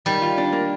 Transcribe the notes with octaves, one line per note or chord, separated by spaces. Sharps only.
D#3 G3
F4
D4
A#3